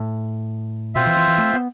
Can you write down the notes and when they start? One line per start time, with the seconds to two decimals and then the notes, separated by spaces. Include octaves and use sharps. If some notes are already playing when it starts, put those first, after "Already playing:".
Already playing: A2
0.95 B2 C4 F4 C5 E5
1.06 E3
1.17 E3
1.28 E3
1.38 A3
1.54 B3